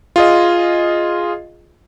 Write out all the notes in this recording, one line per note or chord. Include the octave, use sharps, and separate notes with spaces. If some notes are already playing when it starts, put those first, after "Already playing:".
F4 G#4 D#5